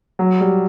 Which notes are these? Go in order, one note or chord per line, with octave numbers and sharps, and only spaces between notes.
F#3
G3